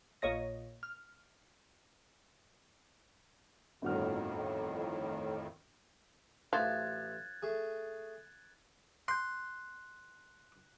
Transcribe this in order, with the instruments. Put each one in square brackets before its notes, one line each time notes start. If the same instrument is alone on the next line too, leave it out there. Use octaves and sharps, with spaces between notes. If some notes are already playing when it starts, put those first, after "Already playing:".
[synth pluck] A#1 A#2 C#5 D#5 A#6
F6
[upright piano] G1 F#4 F6 [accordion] F2 A2 D#3
[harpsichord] A1 E5 A5 [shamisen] F3 F#3 [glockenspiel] F#6 G#6 A6
[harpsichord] A3 G#4
[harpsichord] C6 [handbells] F#6 G6